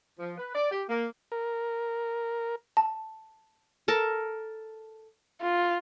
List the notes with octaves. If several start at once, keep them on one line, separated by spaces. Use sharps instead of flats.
F3
B4
D5
G4
A#3
A#4
A5
A4 A#4 A5
F4